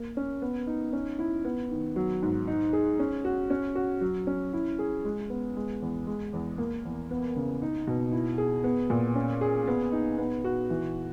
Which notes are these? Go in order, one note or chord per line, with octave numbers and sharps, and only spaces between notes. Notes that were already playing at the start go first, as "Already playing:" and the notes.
Already playing: A#3
C#4
B3
D#4
C#4
E4
B3
D#3
F#3
G#2
D#4
G#4
C#4
F#4
C#4
F#4
F#3
C#4
E4
G#4
G#3
B3
G#3
E2
G#3
E2
A#3
E2
B3
C#3
D#4
B2
E4
G#4
B3
A#2
C#4
G#4
B3
D#4
B3
F#4
E3